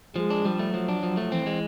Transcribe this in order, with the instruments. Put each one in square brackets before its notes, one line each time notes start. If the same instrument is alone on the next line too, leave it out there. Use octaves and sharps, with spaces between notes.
[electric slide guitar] F3 [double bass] G#3
[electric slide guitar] D4
[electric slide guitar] F3 [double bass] G3
[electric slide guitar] A3
[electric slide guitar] F3 [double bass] F#3
[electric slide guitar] D4
F3
A3
[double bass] E3 [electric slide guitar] C4
[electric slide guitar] G#3